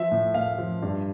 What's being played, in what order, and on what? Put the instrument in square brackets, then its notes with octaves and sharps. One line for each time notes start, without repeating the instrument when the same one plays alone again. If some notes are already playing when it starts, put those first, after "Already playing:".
Already playing: [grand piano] F3 E5
A2
A2 F5
F3
G2